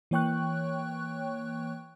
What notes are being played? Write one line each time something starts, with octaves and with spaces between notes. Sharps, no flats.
E3 A#3 C#5 G5 C#6 F#6